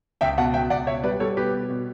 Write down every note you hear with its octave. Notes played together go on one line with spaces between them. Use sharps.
C#2 E5 G5
B2 F#5 A5
C#2 E5 G5
C#2 D5 F#5
B2 C#5 E5
G3 B4 D5
G3 A4 C#5
B2 G4 B4
B2
B2